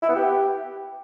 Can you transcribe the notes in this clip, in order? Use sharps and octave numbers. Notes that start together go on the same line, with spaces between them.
E4
B3
G4